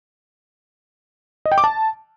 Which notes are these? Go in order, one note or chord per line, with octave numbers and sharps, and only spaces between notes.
D#5
G5
D6
A5